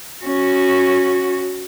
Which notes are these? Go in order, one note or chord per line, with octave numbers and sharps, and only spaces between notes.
C#4 F#4